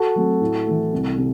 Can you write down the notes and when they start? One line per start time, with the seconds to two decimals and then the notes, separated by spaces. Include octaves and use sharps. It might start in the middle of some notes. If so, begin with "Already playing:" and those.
Already playing: F#4 A4
0.16 F#3 A3 C4
0.41 A2
0.67 E3 A3
0.93 C2
1.18 C3